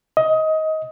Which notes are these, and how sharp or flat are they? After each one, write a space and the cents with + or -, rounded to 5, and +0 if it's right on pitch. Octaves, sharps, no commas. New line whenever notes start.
D#5 +20